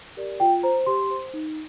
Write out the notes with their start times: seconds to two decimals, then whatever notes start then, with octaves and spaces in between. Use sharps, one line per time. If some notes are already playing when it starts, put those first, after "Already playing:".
0.17 G4 A#4 D5
0.40 F4 G5
0.63 C5 A#5
0.86 G4 C6
1.10 C5
1.34 D#4